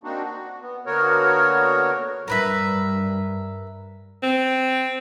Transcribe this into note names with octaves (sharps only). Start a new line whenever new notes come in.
A#3 C4 D4 D#4 F#4
F#4
B3
D3 A#3 B3 F#4 A#4 C#5
G2 A#4 B4 E5
C4